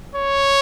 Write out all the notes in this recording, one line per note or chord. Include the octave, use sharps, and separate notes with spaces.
C#5